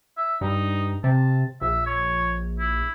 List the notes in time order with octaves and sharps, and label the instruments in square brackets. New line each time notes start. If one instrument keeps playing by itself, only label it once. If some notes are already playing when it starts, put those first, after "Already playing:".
[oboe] E5
[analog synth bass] G2 [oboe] D#4
[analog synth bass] C3 [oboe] A5
[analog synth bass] A#1 [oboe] E5
[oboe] C#5
E4